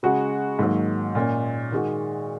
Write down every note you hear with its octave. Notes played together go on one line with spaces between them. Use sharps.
C#3 G#3 F#4
G#2 D#3 F#3 A#3
A#2 A#3 C#4
D#3 G#3 F#4